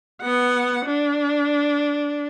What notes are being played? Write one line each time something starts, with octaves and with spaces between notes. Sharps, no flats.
B3 F#5
D4